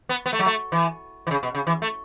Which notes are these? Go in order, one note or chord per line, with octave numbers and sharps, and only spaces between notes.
B3
B3
A3
F#3
A3
E3
E3
C#3
B2
C#3
E3
A3